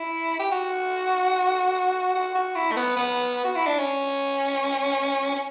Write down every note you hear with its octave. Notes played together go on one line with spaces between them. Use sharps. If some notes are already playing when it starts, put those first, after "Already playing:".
Already playing: E4
G4
F#4
F#4
F#4
E4
A3
B3
B3
F#4
E4
D4
C#4
C#4